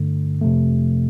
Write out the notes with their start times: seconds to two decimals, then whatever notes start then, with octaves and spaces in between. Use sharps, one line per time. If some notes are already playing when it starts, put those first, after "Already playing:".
Already playing: G2 D3 A3
0.41 F2 C3 F3 A3